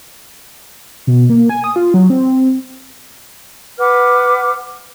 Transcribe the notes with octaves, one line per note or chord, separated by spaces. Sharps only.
B2
A#3
G#5
D#6
F4
F#3
C4
B4 F#5 D6 F6